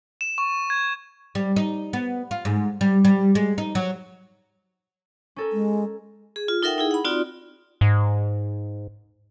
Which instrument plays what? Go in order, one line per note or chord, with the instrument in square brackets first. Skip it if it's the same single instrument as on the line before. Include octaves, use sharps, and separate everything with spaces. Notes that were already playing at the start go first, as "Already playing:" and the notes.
[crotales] E7
C#6
G#6
[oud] G3
D#4
B3
F4
G#2
G3
G3
G#3
D#4
F#3
[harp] C#4 A4 A#4
[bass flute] G#3
[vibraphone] G#4
F4
D#4 A4 A#4 E5 F#5 G5
D#4 E4 G#4
F#5 B5
C4 D#4 F4 F#4 D5
[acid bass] G#2